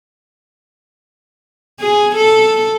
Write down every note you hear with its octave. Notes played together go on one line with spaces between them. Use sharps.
G#4
A4